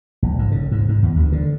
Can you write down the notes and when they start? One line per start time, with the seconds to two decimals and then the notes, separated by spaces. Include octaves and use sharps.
0.22 A#1
0.39 G#2
0.51 C#3
0.72 G#2
0.89 G#2
1.03 E2
1.15 D2
1.32 D3